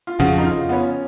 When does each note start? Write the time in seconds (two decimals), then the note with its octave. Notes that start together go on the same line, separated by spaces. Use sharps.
0.07 F4
0.19 F2 C#3 F3 F#4
0.38 D#4
0.46 F4
0.69 B3
0.72 C#4